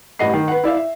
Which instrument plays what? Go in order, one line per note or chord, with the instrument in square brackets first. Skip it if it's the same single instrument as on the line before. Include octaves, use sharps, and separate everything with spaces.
[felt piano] A1 G2 G3 D#5 F#5 C7
D#3
B4 F#5
E4 D5 E5 F5
E5